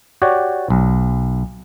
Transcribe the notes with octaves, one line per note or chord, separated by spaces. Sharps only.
F#4 G4 C#5 D5
B1